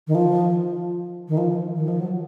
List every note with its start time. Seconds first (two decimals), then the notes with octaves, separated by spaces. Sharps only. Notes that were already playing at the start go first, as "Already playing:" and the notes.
0.07 D#3
0.15 F3
1.28 D#3
1.38 F3
1.76 D#3
1.88 F3
2.00 F#3